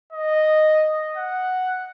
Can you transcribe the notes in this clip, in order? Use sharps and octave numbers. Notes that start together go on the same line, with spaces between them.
D#5
F#5